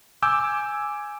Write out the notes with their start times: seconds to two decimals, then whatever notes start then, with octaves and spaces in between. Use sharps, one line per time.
0.22 G#5 D6 E6 G6